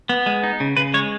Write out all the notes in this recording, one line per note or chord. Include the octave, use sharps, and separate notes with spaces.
B3
G#3
D#4
C#3
C#3 B4
G#3 C#5